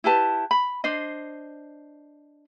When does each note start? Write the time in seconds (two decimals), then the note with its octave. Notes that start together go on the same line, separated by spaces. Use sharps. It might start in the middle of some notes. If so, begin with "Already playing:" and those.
0.04 E4 G4 B4 A5
0.51 B5
0.84 D4 C5 D#5